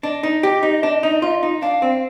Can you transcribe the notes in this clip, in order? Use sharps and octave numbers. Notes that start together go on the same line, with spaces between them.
D4 D#5
D#4
G4
D#4
D4
D#4
F4
D#4
D4 F5
C4